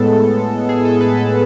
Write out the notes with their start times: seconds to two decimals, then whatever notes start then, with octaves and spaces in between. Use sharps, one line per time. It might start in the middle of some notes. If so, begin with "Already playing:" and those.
Already playing: A2 G#3 B3 A4
0.69 G#4
0.85 A4
1.01 B4
1.17 A4